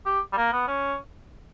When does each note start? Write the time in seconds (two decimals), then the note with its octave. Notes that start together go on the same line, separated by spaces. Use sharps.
0.06 G4
0.33 G3
0.37 A#3
0.53 B3
0.67 C#4